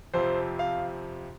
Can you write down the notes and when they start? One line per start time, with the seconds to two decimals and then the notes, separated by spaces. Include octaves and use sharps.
0.14 F2 C3 F3 C5
0.59 F5